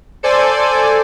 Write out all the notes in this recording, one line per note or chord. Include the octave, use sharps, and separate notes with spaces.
A4 C5 D5 G#5